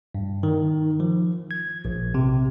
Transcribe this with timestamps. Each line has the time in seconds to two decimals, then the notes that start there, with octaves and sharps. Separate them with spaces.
0.15 G2
0.43 D#3
1.00 F3
1.51 G#6
1.85 A#1
2.14 C3